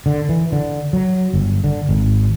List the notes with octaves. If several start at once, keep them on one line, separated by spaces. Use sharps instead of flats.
D3
E3
D3
F#3
G1
D3
G#1